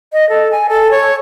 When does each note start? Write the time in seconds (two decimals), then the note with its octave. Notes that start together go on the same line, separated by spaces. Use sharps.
0.13 D#5
0.29 A4
0.51 G#5
0.69 A4
0.91 C#5